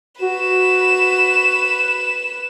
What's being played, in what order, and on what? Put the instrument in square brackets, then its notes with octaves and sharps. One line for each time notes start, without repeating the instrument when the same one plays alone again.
[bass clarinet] F#4 [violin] B4 E7